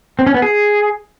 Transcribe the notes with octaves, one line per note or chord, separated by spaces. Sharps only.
C4
C#4
B3
G#4